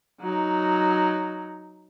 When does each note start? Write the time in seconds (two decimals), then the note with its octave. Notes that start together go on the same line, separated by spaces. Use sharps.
0.21 F#3 D#4